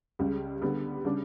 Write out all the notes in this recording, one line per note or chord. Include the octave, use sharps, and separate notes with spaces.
C#2 C#3 G3
D3 G3 B3
C#3 G3 D4